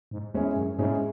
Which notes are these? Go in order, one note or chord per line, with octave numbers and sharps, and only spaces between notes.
G#2
E2 G#3 C#4 E4 G#4
F#2
G#2 G#3 C#4 E4 G#4